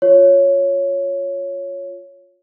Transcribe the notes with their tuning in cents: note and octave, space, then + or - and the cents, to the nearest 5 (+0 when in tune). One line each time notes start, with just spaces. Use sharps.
F4 +15 C#5 +0